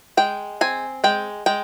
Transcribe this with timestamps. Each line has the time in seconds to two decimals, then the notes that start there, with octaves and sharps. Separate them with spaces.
0.17 G#3 G5
0.61 C4 G#5
1.04 G#3 G5
1.46 G#3 G5